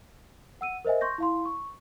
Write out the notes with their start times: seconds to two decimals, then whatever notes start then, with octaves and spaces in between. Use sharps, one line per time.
0.61 F#5 E6 D#7
0.85 A#4 C5 D#5 E5 G#5
1.01 C6 C#6 G6 A#6
1.18 E4 F5 C6
1.46 C#6